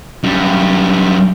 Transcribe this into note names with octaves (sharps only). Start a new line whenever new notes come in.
F#2 G3